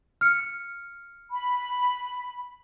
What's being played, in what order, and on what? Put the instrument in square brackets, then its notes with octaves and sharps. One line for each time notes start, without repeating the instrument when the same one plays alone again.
[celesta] F6 C#7
[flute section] B5